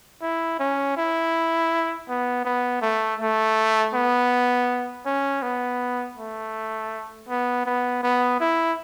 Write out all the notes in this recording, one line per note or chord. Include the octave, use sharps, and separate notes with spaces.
E4
C#4
E4
B3
B3
A3
A3
B3
C#4
B3
A3
B3
B3
B3
E4